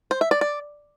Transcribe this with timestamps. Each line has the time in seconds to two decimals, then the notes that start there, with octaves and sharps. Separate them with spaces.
0.11 C5
0.21 E5
0.31 D5
0.41 D5